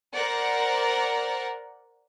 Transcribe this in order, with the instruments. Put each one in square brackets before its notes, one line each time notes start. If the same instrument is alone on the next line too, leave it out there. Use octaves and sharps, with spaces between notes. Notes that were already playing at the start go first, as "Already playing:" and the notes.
[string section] A#4 C5 D5 F#5